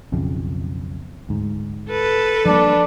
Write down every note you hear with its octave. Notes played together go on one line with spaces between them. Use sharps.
B1 F2 C#3
D2 G#2
A4 B4
F3 G3 A#3 D4